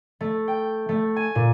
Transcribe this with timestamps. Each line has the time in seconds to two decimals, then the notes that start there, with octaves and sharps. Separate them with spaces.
0.21 A3
0.48 G5
0.89 A3
1.16 G#5
1.35 A#2